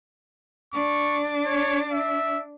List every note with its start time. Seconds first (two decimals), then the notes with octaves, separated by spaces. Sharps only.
0.73 D4 C#6
1.46 C#5
1.92 E5